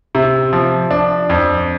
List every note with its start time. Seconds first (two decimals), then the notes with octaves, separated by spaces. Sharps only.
0.15 C3
0.53 F3
0.91 D4
1.29 F2